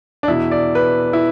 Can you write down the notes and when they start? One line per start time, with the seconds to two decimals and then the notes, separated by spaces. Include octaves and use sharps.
0.23 D4
0.28 E2 B2 E4
0.51 D5
0.75 B4
1.13 E4